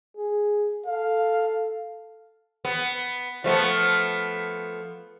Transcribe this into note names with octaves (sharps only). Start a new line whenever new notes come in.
G#4
A4 F5
B3
F3 A3 B3